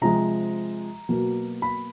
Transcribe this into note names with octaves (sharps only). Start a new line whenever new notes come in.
C3 F3 G#3 A#5
B2 F#3 A#3
B5